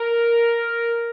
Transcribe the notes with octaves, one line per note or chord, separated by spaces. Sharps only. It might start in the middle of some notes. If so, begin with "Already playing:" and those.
Already playing: A#4